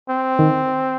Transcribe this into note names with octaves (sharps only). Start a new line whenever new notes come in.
C4
D#3